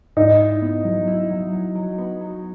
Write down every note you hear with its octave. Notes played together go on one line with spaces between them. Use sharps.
G#2 D#4
E4
B3
F#3
E4
F#3
F#3
F#3
B3
F#3